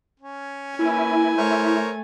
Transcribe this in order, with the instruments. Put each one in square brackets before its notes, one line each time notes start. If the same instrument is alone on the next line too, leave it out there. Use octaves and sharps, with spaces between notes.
[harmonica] C#4
[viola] A#3 B4 [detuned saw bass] E4 [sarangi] G#5
[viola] A3 [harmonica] A#4 C5 C#5